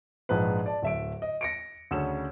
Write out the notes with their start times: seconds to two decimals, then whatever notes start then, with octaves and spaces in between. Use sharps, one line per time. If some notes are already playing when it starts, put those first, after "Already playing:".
0.29 A#1 G#2 F3 B4
0.66 D5 A5
0.82 D1 E5 D7
1.22 D#5
1.41 A#6 C#7 D7
1.91 D2 C#3 C#4 E7